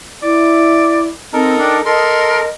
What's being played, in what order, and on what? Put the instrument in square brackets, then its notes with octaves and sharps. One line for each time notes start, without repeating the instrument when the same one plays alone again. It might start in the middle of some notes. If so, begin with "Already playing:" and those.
[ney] E4 [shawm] D5
[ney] C4 [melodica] D#4 A4 A#4
[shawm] D4 [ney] G5
[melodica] A4 C6 [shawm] A#4 [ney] D#5